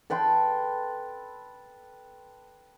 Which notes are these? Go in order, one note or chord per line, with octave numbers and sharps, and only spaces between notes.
A4 B4 G5 C6